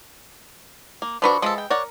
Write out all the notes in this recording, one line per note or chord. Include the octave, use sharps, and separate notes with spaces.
A#3
D3 F3 D4 F#4 B4 C#6
F3 G#3 A4 B5
G5
A#4 C#5 D5 F#5